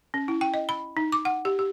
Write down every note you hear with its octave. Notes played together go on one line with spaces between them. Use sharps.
C#4
E4
G5
D#5
B5
D#4
D6
F#5
G4
G4